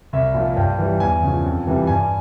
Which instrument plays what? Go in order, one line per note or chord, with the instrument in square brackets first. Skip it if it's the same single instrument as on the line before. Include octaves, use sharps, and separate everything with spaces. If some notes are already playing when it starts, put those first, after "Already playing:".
[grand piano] C2 E5
A#2 F3
G2 G5
E3 G3
E2 G#5
C#3 F3
F2
C3 E3 G3
G2 G#5